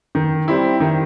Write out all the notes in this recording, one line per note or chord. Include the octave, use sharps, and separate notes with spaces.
D#3
G3 C4 E4
D#3